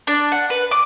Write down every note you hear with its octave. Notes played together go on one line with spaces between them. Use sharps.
D4
F#5
B4
D6